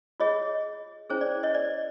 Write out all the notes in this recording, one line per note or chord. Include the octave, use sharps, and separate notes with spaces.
F4 G#4 C#5 D#5
C#4 E4 G#4 C5 C#5
D5
C#5 D#5
D5